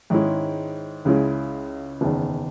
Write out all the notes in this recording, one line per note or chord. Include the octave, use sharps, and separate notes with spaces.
G#2 D#3 G#3 C#4 E4
C#2 C#3 G#3 C#4 E4
F#1 E2 D#3